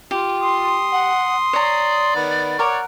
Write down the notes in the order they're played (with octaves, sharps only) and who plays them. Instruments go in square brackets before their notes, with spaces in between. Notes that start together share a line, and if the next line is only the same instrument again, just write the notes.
[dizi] F4 [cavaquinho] G4
[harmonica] C6 D#6
[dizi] F#5
[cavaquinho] C#5 A#5 [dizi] D5
[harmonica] D#3 B3
[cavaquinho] A#4 F#5 [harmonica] C#5 D6